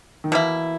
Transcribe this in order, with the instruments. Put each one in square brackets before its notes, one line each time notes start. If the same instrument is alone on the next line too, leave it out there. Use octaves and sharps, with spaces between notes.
[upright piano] D#3
[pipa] B2 A#3 E4 [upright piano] E3